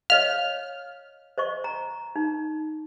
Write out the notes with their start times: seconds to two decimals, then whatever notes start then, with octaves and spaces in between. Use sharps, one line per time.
0.10 C#5 D#5 F5 F6
1.38 C5 D#5 C#6
1.64 A#5
2.16 D#4